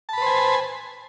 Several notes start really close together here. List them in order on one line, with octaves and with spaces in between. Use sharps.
A5 B5 B4 C5 G#5